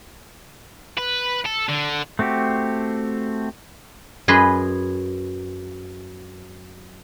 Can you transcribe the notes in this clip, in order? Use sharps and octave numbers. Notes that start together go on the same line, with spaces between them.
B4
A4
D3
A3 C4 F#4 G4
F#2 G#4 B4 D#5 C6